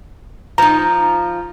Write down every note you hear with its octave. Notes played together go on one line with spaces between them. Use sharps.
F3 D#4 A#5